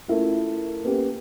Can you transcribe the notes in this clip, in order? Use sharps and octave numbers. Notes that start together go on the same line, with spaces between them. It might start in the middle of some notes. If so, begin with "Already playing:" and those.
A3 C#4 E4 F4 A#4
A#3 B3 C#4 G4